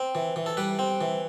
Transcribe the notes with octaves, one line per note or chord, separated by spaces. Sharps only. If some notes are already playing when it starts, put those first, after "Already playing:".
Already playing: C4
E3
E3
A4
G3 B4
C4
E3